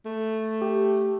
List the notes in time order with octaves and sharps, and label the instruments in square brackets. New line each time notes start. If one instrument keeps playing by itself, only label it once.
[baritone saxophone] A3
[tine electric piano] G4